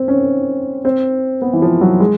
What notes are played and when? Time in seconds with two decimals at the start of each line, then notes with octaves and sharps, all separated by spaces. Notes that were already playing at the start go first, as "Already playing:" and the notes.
Already playing: C4
0.08 C#4
0.85 C4
1.42 B3
1.53 E3
1.62 F3
1.81 F#3
2.00 G#3